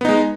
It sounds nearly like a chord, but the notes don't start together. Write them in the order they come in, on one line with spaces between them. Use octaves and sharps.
B3 D#4 G#3